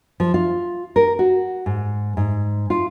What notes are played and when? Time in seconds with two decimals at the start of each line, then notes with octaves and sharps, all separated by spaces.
0.20 F3
0.34 F4
0.96 A#4
1.19 F#4
1.66 G#2
2.17 G#2
2.70 F4